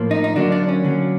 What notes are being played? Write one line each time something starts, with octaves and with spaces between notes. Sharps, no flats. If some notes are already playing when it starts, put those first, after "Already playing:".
Already playing: A2 F3 A#3
D#4
D#4
D3 F#3 A#3 D4
D4
C#4
D3 F#3 A#3